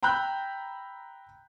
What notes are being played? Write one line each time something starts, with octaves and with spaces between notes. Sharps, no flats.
G5 A#5 B5 E6 F#6 G6